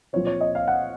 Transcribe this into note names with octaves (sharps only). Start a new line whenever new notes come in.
A#2 F3 C4 C#5
C#5
D#5
F5
F#5